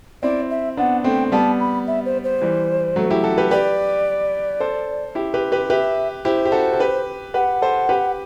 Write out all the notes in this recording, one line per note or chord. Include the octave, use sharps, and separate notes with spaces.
C4 E4 D5
E5
B3 D4 F#5
A3 C4 G5
G3 B3 A5
B5
E5
C5
C5
E3 G3
F#3 A3
E4 G4
F#4 A4
G4 B4
G4 B4 D5
A4 C5
E4 G4
G4 B4
G4 B4
G4 B4 E5
E4 G4 C5
G4
F#4 A4
A4
G4 B4
G4 B4 F#5
A4 C5
G4 B4